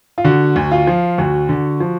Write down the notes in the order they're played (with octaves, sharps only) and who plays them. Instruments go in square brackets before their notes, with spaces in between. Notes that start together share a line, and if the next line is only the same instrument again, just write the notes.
[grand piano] F4
D3 F#4
D2
F4
F3
D2 F#4
D3
F3